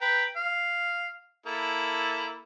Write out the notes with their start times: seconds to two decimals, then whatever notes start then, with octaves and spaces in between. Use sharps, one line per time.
0.01 B4 G5 A#5
0.36 F5
1.46 A#3 E4 A4